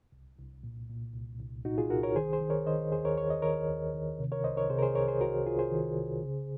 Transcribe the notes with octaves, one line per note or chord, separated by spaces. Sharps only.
C2
C2
A#2
A#2
C2
C2
A#2 D#4 F#4
F4 G#4
C2 F#4 A#4
A#4 C#5
D#3 G#4 C5
G#4 C5
D#3
A#4 C#5
D#3 C5 D#5
D#2 G#4 C5
A#4 C#5
D#2 C#5
D#5
D#3 A#4 C#5
D#2
D#3
C3
A#4 C#5
C2 C5 D#5
A#4 C#5
C3 G#4 C5
A#4
G#4 C5
C2 A#4 C#5
G#4 C5
C2 F#4 A#4
C2 F4 G#4
G#4 C5
D#3
C2
C#3